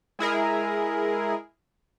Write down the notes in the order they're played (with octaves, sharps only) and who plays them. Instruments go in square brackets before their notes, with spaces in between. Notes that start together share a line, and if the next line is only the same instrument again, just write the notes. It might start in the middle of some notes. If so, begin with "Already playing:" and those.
[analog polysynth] G#3 E4 G#4 A#4